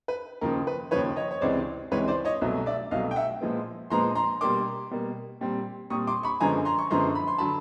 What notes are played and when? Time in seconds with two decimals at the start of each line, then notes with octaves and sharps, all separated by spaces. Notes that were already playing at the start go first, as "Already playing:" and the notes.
0.08 B4
0.41 D#2 C#3 F3 A#4
0.67 B4
0.91 D#2 C#3 F3 B4 C#5
1.16 C#5 D#5
1.31 C#5
1.41 C#2 C3 E3 G#3 C4 C5 D5
1.91 C#2 C3 E3 G#3 C4 B4 C#5
2.08 C5 D5
2.25 C#5 D#5
2.41 C2 B2 F#3 A3
2.66 D5 E5
2.91 C2 B2 F#3 A3 D#5 F5
3.11 G5
3.16 E5 F#5
3.41 A#2 F3 G#3 B3
3.90 A#2 F3 G#3 B3 A#5 C6
4.15 A#5 C6
4.41 B2 G3 A#3 C6 D6
4.91 B2 G3 A#3
5.41 A#2 G3 C4
5.90 A#2 G3 C4 C#6 D#6
6.07 C6 D6
6.23 B5 C#6
6.40 F#2 D3 F3 G#3 B3 G#5 A#5
6.65 A#5 C6
6.79 C#6
6.90 F#2 D3 F3 G#3 B3 A#5 C6
7.15 B5
7.27 C6
7.38 D3 F#3 A5 B5